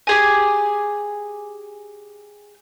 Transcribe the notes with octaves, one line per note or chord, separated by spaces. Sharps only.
G4 G#4 G#5